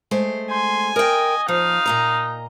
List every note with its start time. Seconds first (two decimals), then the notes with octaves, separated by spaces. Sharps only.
0.11 G#3 A3 C5
0.51 G#5 C6
0.96 A#4 D#5 G5
1.48 F3 D#4 F5
1.86 A#2 D#5 A#5